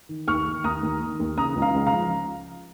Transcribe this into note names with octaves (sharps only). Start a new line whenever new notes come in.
D#3
D#2 C#6 F6
D#3
D#2 A#5 D#6
D#2
D#3
D#2
C#3 A#5 D#6
C#2
F5 A#5
C#2
F5 A#5
F3